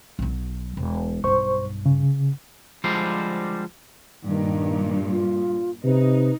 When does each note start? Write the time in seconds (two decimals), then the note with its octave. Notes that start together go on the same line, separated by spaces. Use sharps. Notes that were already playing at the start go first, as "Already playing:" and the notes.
0.19 B1 F#3
0.77 E1
1.24 B1 G2 C5 C#6
1.86 C#3
2.84 D3 F3 G3 G#3 C5
4.26 G2 A#2 D#3
5.11 F4
5.84 C3 D#4 B4